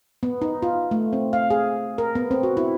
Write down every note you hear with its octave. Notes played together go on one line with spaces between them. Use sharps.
B3
D#4
F4
A3
C4
F5
G#4
A#4
B3
C4
F#4
E4